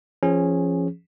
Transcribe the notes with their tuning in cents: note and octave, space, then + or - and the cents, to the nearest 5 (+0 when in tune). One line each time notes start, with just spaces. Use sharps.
F3 -25 C#4 -10 G#4 +0